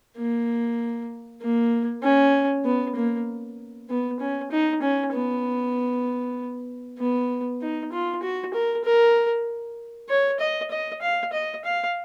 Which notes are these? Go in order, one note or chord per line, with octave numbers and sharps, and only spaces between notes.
A#3
A#3
C#4
B3
A#3
B3
C#4
D#4
C#4
B3
B3
D#4
F4
F#4
A#4
A#4
C#5
D#5
D#5
F5
D#5
F5